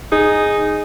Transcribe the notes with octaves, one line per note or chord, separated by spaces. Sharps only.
D#4 G#4